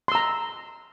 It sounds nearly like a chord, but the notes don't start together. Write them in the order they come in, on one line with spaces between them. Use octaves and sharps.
C6 E6 A#5